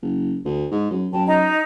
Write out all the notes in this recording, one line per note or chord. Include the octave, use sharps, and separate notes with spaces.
F#1
D2
G#2
F#2
F#2 G5 A5
D#4 D#5 A#5